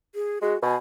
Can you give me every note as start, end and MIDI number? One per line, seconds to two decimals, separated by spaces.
0.15 0.39 68
0.42 0.55 56
0.42 0.58 66
0.62 0.76 47
0.62 0.74 80